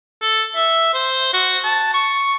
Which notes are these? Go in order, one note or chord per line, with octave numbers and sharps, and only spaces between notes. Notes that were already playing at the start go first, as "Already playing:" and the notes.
A4
E5
C5
F#4
A5
C#6